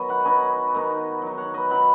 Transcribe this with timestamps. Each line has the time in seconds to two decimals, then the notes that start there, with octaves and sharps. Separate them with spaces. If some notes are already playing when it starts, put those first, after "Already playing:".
Already playing: D#3 F#3 B3 B4 C#5 D#5
0.09 F#5 B5
0.25 D#3 B3 D#4 G#5 C#6
0.74 D#3 B3 D#4
1.22 F#3 D#4
1.38 C#5 F#5
1.54 B4 D#5
1.70 F#3 D#4 F#5 B5